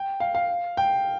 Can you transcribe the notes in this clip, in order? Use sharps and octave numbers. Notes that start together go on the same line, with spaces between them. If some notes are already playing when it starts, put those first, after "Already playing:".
Already playing: G5
F5
F5
G5